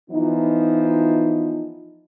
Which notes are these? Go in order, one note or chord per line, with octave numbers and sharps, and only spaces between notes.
E3 F3 B3 D#4